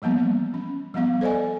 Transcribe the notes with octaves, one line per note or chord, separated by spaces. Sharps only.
E3 F3 G3 A#3 B3
C#4
F3 G3 B3 F5
A4 C5 D5 D#5 G#5